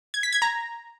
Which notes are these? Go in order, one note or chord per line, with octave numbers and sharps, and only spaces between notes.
G#6
B6
G#6
A#5